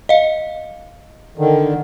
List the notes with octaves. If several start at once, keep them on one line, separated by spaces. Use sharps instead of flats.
D#5 F5
D3 D#3